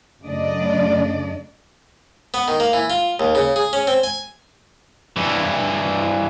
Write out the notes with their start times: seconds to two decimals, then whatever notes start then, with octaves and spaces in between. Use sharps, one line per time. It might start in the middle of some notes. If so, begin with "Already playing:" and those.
0.23 F#2 C#3 A3 D4 D5 D#5
2.34 B3
2.48 D#3
2.60 A#3
2.73 E3
2.90 F4
3.20 D#2
3.35 C#3
3.56 G#4
3.73 C#4
3.87 C4
4.03 G#5
5.16 G2 E3